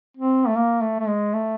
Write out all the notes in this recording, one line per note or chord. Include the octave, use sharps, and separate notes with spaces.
C4
A3
A#3
A3
A3
G#3
A3